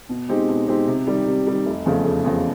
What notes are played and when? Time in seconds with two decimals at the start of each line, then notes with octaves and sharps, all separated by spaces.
0.09 B2
0.29 G#3 C4 D#4 G4
0.48 B2
0.68 G#3 C4 D#4 G4
0.87 C3
1.07 D#3 G3
1.26 C3
1.47 D#3 G3
1.66 F1
1.86 E2 C#3 F3 A3
2.05 F1
2.24 E2 C#3 F3 A3